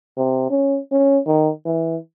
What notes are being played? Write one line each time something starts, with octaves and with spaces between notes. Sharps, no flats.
C3
C#4
C#4
D#3
E3